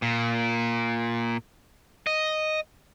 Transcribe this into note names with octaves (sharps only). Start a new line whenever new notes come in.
A#2
D#5